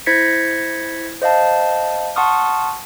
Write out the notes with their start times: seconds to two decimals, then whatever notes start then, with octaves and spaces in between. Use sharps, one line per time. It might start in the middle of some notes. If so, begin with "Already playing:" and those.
0.06 E4 C5 G#6 A#6 B6 C#7
1.22 C5 D#5 F5 A5
2.16 F#5 A5 C6 C#6 D#6 F6